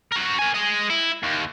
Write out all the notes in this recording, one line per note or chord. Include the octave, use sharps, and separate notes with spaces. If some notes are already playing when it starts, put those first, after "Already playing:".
F#4 A#4
A#4 G#5
G#4 D#5
E4
D#2